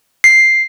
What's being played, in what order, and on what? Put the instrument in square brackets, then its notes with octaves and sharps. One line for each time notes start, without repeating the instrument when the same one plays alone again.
[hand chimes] C7